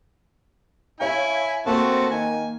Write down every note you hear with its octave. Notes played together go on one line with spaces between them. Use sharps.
E4 C#5 F5 G#5
A3 A#3 C4 F#4 A5
D#3 G#5